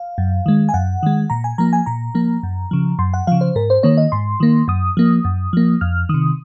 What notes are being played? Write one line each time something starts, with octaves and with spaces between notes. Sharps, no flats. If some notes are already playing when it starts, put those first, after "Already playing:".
Already playing: F5
F#2
D#3 G#3
G#5
F#2 F#5
D#3 G#3
A#2 A#5
G#5
F3 A#3 A#5
G#5
A#2 A#5
F3 A#3
F#2
C#3 F3
F#2 C6
F#5
C#3 F3 F5
C5
G#2 A#4
C5
D#3 A#3 C#5
D#5
G#2 C6
D#3 A#3
F#2 D#6
F3 A#3
F#2
F3 A#3
F2 F6
C3 D#3 D#6